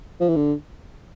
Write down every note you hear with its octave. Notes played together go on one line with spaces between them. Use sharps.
F3
E3
D3